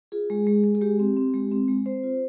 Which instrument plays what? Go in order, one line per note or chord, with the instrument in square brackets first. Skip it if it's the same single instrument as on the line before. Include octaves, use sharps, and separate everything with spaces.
[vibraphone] F4 G#4
G#3
G#3
G#3
G#4
G#3 G4
C4
C4
G#3
C4
G#3
C4 C5
F4